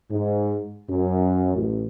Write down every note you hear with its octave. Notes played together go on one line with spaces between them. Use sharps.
G#2
F#2
A1